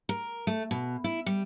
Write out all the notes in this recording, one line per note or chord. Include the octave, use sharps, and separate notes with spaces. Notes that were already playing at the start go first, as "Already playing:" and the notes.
A#4
A3
B2
E4
G3